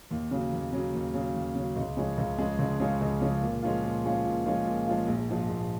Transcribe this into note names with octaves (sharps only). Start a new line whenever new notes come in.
D#2
C#3 F#3
D#2
C#3 F#3
D#2
C#3 F#3
D#2
C#3 F#3
C#2
C#3 F3 G#3 C#4
C#2
C#3 F3 G#3 C#4
C#2
C#3 F3 G#3 C#4
C#2
C#3 F3 G#3 C#4
A#2
F3 G#3 C#4 F4
A#2
F3 G#3 C#4 F4
A#2
F3 G#3 C#4 F4
A#2
F3 G#3 C#4 F4
A#1
G#2 F3
A#1